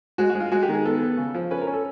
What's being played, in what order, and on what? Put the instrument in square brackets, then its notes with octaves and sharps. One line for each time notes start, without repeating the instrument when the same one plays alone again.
[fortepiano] G#3 F#4
F#4
G#3
F4
G#3 F#4
G4
D#3 G#4
B3 A4
B3
C#3
F3
C#4 B4
A#4
C#4
A4